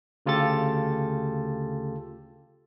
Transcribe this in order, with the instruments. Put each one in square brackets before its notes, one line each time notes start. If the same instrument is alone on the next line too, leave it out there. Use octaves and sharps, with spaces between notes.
[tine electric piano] D2 C#3 F4 G4 A4 A6